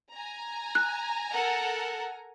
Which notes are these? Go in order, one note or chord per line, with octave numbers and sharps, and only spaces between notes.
G#5 A#5
F#6
A4 A#4 F#5